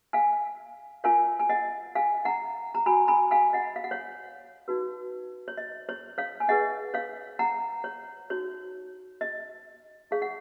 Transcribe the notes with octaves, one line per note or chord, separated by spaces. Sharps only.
F5 G#5
F4 A#4 C#5 F5 G#5
G#5
D#5 F#5
F5 G#5
F#5 A#5
A#5
F#4 C#5 G#5 B5
G#5 B5
F5 G#5
D#5 F#5
F5
F#5
C#5 F5
D#4 F#4 B4
C#5
D#5
C#5
C#5 F5
G#5
D#4 G#4 B4 D#5 F#5
C#5 F5
F#5 A#5
C#5
D#4 F#4 C#5
D#5
D#4 G#4 C#5 F5
F#5